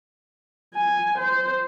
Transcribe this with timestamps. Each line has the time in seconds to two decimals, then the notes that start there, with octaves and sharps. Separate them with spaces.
0.75 G#5
1.18 C5